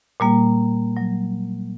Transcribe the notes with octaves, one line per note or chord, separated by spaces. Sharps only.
A#2 G3 A#3
F#3